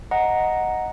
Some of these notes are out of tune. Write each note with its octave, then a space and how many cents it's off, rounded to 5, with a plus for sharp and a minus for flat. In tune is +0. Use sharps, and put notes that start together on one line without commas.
D#5 +5 F#5 -5 A#5 +0